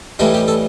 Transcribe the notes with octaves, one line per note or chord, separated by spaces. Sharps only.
A2 E3 G3 D#4 A4
G4
A4